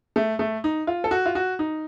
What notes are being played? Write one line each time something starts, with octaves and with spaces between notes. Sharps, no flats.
A3
A3
D#4
F4
A4
F#4
F4
F#4
D#4